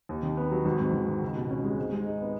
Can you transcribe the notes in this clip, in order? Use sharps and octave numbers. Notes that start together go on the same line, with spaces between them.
D#2
D#3
B3
F#3
G#1
G#2
G#1
D#3
C#2
B2
C#4
G#3
G#2
G#3
D#4
B3